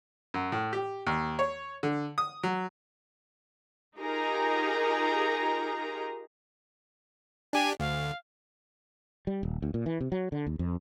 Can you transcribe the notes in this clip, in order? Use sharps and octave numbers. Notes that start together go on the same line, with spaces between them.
F#2
A2
G4
D#2
C#5
D3
D#6
F#3
D#4 F4 G4 G#4 A#4 A#5
D4 G4 G#5
D2 F5
G3
D#1
D2
A#2
E3
C3
F#3
D3
D#2
F2